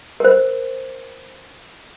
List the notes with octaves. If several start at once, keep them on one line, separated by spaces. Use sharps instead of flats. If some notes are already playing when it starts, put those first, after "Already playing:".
A#4 C5